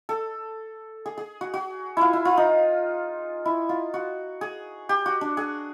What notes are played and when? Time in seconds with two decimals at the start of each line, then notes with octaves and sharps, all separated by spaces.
0.09 A4
1.06 G#4
1.18 G#4
1.41 F#4
1.54 F#4
1.97 E4 F4
2.13 E4
2.25 F4
2.37 D#4
3.45 E4
3.69 F4
3.94 F#4
4.41 G#4
4.89 G4
5.06 F#4
5.21 D4
5.37 G#4